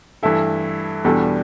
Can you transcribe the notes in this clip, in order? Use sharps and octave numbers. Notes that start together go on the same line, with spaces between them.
G2 E3 A3 E4 A4
E2 B2 G3 D4 A4